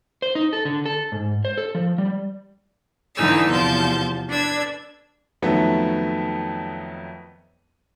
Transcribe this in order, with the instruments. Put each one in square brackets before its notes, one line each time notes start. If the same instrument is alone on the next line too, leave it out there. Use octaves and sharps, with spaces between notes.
[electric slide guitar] C5
D#4
A4
D3
A4
G#2
C5
A4
F3
G3
[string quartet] D3 E3 D#4 G#5 E6
E2 C3 F3 A5 G6
D4 B4 E6 G#6
[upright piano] F2 D#3 F#3 A3 B3